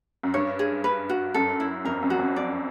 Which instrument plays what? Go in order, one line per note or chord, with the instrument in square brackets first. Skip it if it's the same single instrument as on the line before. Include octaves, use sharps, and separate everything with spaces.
[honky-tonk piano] F#2
[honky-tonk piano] G2 [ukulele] C#5
[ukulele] G#4
B4
F#4
[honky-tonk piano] F#2 [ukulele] A4
[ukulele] E4
[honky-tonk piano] F2 [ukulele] A#4
[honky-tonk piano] F#2
[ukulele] F#4
[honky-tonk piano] F2
[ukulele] D5